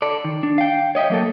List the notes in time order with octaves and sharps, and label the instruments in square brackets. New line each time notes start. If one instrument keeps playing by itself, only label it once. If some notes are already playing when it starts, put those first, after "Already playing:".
[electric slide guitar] A4 D5
D#3
D4
F5 G5
C#5 D#5 E5 G5
F#3 A#3 A4